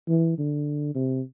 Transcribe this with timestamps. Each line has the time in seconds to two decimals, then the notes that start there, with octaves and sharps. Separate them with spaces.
0.09 E3
0.38 D3
0.95 C3